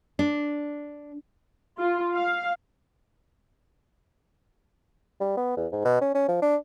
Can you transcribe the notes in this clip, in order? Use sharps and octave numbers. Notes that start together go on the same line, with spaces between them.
D4
F4
F5
G3
B3
E2
G#2
B2
C#4
C#4
F3
D4